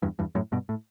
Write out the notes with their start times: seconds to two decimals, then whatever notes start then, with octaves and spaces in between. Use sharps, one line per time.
0.02 E2 G2
0.19 E2 G2
0.35 F#2 A2
0.52 G2 B2
0.69 A2